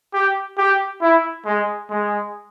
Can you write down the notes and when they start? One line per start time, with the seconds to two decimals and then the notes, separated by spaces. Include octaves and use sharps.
0.13 G4
0.58 G4
1.02 E4
1.46 G#3
1.90 G#3